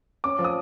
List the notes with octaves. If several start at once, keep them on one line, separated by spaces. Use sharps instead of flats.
C#4 D6
F3
D#6